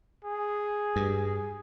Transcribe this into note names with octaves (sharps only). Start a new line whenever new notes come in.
G#4
G2